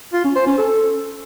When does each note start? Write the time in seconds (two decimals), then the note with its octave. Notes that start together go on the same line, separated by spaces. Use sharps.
0.13 F4
0.25 C#4
0.36 C5
0.47 C#4
0.58 A4